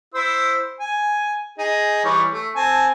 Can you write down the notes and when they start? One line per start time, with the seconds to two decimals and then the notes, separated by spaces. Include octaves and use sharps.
0.14 E4 C5 E6
0.80 G#5
1.58 D#4 G#4
2.04 E3 G3 C#5
2.32 A3
2.56 C4 G#5 A5